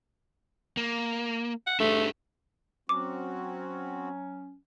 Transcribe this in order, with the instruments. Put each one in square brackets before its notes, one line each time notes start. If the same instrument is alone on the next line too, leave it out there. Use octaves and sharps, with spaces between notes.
[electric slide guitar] A#3
[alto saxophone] F#5
[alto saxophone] A3 [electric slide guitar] D4 G4 G#4
[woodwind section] F#3 C#4 [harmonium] C4 F#4 [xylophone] D6